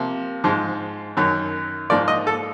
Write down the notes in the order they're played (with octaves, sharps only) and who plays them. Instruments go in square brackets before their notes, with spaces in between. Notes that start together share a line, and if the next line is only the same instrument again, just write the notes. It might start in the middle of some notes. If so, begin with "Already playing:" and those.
Already playing: [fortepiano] C3 F3 A#3
G#2 F3 G#3
F#2 D#3 F#3
G#2 F3 A#3 D5
D#5
A4